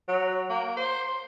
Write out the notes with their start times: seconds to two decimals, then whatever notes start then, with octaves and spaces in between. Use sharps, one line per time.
0.08 F#3
0.50 A#3
0.77 C5